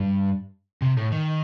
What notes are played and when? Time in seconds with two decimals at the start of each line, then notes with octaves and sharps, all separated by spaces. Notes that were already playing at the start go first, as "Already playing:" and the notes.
Already playing: G2
0.82 C3
0.97 A2
1.12 D#3